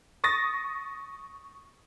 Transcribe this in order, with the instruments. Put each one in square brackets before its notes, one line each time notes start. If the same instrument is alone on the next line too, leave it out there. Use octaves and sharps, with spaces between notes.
[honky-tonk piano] C#6 D#6 A6 A#6